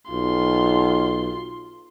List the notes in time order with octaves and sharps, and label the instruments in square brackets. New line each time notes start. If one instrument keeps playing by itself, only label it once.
[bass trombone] B1 [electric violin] F4 C6